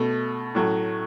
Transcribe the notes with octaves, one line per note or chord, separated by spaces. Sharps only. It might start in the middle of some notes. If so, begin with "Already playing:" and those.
Already playing: B2 A3
A2 F#3 A3